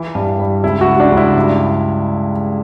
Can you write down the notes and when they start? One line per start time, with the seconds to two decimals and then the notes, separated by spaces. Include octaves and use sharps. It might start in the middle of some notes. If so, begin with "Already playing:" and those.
Already playing: E3 E4
0.15 G2
0.39 G3
0.63 C#2 E4
0.81 F#4
0.88 C#2
1.00 D4
1.12 C#2
1.17 E4
1.36 G2